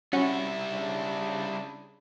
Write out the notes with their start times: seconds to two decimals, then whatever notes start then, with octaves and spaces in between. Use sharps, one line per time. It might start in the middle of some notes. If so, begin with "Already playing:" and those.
0.13 G3 C#4 E4 F#4
0.71 C#3 D4